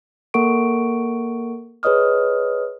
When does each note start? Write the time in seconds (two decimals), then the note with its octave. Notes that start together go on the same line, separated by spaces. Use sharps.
0.34 A#3 A4 A#4 F#5 C#6 D7
1.83 G#4 B4 C#5 D#5 D#6 F6